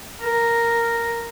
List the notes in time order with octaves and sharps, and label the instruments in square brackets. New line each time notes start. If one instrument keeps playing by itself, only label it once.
[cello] A#4